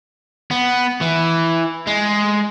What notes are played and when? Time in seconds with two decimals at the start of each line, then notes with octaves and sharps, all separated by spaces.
0.51 B3
1.01 E3
1.87 G#3